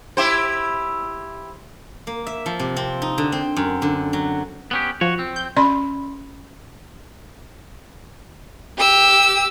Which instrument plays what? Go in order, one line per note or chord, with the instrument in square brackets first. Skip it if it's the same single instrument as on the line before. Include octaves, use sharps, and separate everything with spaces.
[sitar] E4 G4 C5
[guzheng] A#3
E5
F3
C3
C4
D#4
D3
C4
F#2
D3
F#3
[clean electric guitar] B3 C#4 G4
[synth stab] F3 [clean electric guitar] F#4 C#5
[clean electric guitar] C4
[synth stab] G6
[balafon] C#4 D5 B5 C6
[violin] G4 E6